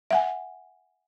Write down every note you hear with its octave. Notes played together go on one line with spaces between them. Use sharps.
E5 F#5 G#5